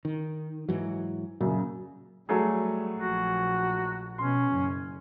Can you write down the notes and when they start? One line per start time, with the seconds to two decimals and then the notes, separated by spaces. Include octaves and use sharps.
0.05 D#3
0.69 G#2 E3 F#3
1.41 F#2 A#2 C#3
2.29 F#3 G3 A3 G#4
2.96 A#1 F#4
4.18 B2 C#4 C6
4.52 F#1